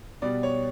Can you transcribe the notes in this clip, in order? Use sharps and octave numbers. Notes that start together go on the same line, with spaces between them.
B2 G3 B3 D5
C#5